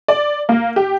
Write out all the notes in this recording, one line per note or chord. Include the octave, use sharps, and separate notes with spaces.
D5
A#3
G4